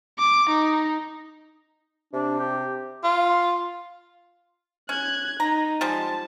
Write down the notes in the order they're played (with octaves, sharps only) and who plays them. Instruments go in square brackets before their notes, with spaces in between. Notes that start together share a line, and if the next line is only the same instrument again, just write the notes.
[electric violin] D6
D#4
[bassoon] C3 [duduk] D4
[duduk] G4
[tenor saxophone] F4
[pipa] C#4 [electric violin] F#6 G#6
[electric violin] D#4 [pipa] A#5
[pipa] F3 G3 G#3 [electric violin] A5